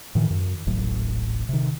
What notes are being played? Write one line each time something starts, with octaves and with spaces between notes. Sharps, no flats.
A2 D#3 E3
F#2
D#1 A1 A2 F#3
C3 D#3